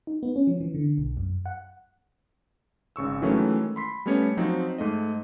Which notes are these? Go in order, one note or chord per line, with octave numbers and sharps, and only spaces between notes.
D#4
B3
C#4
F3
E3
D3
B1
F#2
F#5
G#1 C#3 C#6 E6
D#3 E3 F#3 G#3 A3 C#4
B5 C6 B6
G3 A3 B3 C#4 C#5
F3 F#3 C4 D#4
G#2 A3 D#5